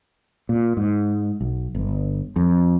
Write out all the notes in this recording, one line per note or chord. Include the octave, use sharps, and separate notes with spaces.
A#2
G#2
B1
G1
F2